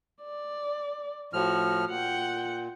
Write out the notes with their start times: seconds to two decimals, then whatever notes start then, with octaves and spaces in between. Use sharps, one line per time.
0.23 D5
1.33 A2 F3 F#4 F6
1.90 A#2 F#5 G5